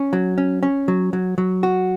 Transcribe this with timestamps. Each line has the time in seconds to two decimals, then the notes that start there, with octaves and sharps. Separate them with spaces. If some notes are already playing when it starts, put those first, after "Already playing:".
Already playing: C#4
0.13 F#3
0.38 C#4
0.63 C#4
0.88 F#3
1.13 F#3
1.38 F#3
1.63 F#4